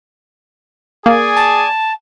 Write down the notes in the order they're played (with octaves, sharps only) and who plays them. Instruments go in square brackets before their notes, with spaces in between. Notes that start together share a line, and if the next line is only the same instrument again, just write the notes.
[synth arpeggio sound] A#3 [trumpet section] G#4 D5 G#5
[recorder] A5